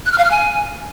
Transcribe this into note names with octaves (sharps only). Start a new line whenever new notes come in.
F#6
F6
F5
F6
G#5